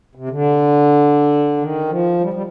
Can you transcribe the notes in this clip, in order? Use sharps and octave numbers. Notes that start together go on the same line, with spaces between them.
C3
D3
D#3
F3
G3
G3